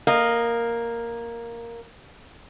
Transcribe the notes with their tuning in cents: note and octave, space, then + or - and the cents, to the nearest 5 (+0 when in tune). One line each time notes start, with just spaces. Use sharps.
A#3 +0 D#5 -15